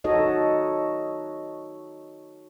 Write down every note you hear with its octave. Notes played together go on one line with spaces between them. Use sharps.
D#4 F#4 A4 C#5 D#5